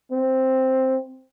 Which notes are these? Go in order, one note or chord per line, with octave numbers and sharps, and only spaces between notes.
C4